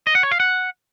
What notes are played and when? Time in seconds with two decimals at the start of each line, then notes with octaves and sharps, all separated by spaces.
0.07 D#5
0.15 F#5
0.23 C#5
0.32 F5
0.40 F#5